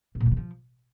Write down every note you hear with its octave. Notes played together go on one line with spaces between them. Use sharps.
A2
A#2
F3
E3
F3